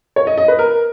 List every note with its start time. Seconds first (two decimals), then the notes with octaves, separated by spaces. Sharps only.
0.16 C#5
0.27 D#5
0.38 D#5
0.48 B4
0.59 A#4